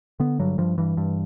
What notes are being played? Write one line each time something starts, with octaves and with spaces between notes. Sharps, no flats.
D3 B3
G2 F#3
G2 F3
G2 E3
G2